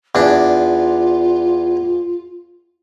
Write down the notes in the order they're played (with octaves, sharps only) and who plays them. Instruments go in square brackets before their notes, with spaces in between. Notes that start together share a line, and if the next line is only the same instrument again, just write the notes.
[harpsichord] E2 D4 [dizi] F4